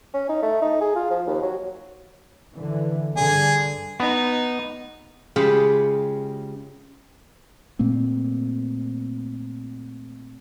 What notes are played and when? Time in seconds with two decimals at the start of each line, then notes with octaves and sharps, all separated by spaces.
0.14 C#4
0.29 D#4
0.42 A3
0.62 D#4
0.81 G#4
0.95 F4
1.10 F3
1.27 D#2
1.42 F#3
2.55 D3 E3
3.17 G2 D3 G#4
4.00 B3 D#4
5.36 C#3 G#3 F4 G4 A5 B5
7.79 A#2 A3 A#3 C4